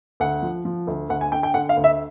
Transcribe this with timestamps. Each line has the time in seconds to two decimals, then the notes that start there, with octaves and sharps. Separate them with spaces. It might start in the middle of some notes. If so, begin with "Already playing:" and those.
0.20 D2 F#5
0.42 F3
0.65 F3
0.87 D2
1.09 D2 F#5
1.21 G#5
1.32 D3 G5
1.43 G5
1.54 D3 F#5
1.69 F5
1.77 D2
1.84 E5